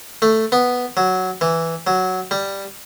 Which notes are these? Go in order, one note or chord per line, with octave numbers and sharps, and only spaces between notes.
A3
B3
F#3
E3
F#3
G3